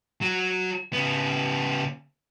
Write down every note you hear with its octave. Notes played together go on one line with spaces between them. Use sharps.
F#3 F#4
C#3 B3